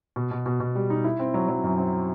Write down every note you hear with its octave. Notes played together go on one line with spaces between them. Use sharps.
B2
B2
B2
B2
G3
D#4
E4
C4
F#3
F#3
F#2
C4